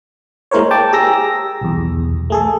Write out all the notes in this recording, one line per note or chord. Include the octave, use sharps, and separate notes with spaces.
G#3 A#3 E4 A#4 C5 C#5
G5 A5 D6
G4 G#4 A#5 E6 A#6
B1 E2
A3 G#4 A4